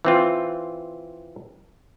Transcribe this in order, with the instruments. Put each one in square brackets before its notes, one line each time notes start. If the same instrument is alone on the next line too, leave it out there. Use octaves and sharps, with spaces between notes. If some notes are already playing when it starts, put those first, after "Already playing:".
[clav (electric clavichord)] E3 C4 F4